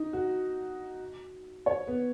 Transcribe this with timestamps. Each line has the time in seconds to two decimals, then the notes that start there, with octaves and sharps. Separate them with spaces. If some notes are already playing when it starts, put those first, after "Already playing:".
Already playing: D#4
0.13 F#4
1.66 C#5
1.87 B3